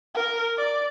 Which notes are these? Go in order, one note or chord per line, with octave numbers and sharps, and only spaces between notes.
A#4
D5